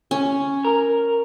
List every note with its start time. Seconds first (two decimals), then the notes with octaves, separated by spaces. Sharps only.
0.11 C#4
0.65 A#4